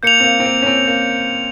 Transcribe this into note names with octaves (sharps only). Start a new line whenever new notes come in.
A#3 G6 C#7 F7
C4
A#3
C4
A#3
C#4
C4
A#3